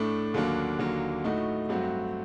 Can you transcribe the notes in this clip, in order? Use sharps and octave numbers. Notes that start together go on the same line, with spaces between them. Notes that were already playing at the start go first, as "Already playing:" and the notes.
Already playing: A2 A3 D4
D#2 D3 F#3 A#3 D4
D#2 D3 F#3 A#3
A2 A3 D#4 F#4
G2 F#3 A3 C4 F#4